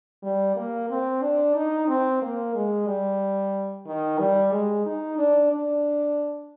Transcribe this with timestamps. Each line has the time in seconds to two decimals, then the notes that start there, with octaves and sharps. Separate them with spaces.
0.23 G3
0.56 A#3
0.90 C4
1.22 D4
1.56 D#4
1.88 C4
2.22 A#3
2.55 G#3
2.87 G3
3.86 D#3
4.19 G3
4.52 G#3
4.86 D#4
5.19 D4
5.51 D4